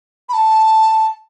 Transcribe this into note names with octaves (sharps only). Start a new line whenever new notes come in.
B5
A5